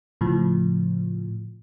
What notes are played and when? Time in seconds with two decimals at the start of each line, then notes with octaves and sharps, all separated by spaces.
0.21 A2 C#3 F3